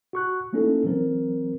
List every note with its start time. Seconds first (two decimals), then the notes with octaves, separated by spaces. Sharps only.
0.13 F#4 C#6 F#6
0.53 A3 A#3 C#4 D#4 E4 A4
0.85 E3 F#3 C4 A#4 C5